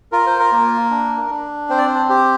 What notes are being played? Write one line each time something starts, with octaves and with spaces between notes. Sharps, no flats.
F4 A#4
C5
A#4
A#3
D4
D4
C4 C5
D5
C5
G4 C5